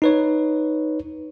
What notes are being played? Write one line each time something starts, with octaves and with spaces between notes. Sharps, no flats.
D#4 B4 C#5